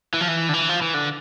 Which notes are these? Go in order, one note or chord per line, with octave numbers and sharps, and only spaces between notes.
E3
F3
E3
D3
E3
F3
E3
D3